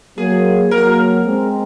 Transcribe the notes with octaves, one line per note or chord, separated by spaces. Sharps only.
F#3 A#3 G#4
F#3 A#3 A#4
G#3 C4